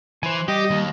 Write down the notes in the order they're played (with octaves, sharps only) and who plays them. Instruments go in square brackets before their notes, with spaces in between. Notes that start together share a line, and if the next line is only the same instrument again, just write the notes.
[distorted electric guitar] E3 [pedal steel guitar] C5 G#5
[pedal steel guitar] G3 [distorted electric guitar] G4 [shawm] D#5
[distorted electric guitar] D#2